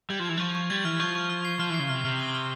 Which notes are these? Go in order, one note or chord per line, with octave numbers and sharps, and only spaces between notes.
G3 G#6
F3
E3 G#6
F3 C#6
C#6
G3 G#6
E3 F6
F3 C#6
C#6
F6
C7
F3 F6
E3
C#3 C7
C3 F6
C3 F6
G7
F6